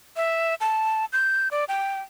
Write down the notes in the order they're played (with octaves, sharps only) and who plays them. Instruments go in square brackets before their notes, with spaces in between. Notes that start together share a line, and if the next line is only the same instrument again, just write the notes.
[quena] E5
A5
G6
D5
G5